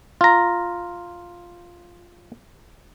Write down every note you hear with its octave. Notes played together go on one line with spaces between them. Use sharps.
F4 A#5